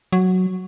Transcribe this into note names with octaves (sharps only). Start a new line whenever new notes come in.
F#3